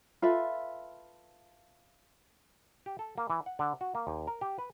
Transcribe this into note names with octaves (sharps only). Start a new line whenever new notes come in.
F4 A4 B4 E5
G4
A4
A#3
E3
F#5
D3
F#4
A#3
D#2
A#4
G4
B4